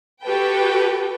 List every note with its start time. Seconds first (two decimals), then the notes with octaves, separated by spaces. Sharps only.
0.23 F#4 G4 A4 B4 G5